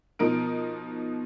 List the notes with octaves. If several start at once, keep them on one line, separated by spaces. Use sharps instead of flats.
B2 F3 D#4 A#4 D7